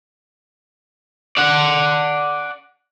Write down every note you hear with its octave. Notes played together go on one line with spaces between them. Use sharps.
D5 F#5